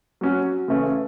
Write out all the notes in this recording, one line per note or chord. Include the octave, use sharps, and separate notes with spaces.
F#3 C#4 F#4
C#3 E3 A3 C#4